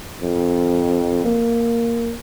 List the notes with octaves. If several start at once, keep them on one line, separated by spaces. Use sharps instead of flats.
F2
A#3